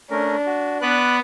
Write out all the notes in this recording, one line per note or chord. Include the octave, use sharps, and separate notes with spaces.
A3 C#4 D4 A#4
F#4
B3 B4 D5 F#6